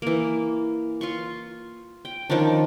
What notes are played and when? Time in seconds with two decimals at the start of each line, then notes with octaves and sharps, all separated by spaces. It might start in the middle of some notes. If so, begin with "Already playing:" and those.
0.02 E3 A#3
1.01 F4 C6 C#6
2.05 G5
2.30 D#3 F3 C#4 D4